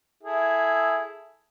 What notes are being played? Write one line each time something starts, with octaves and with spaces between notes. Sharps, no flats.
E4 G#4 A4